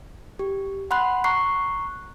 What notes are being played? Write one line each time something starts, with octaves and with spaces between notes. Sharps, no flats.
G4
F#5 B5 C6 F#6
A#5 C#6 F#6 C7